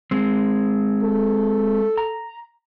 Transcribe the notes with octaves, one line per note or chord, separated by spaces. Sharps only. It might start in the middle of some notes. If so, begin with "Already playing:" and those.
G#3 C4
A4
A#5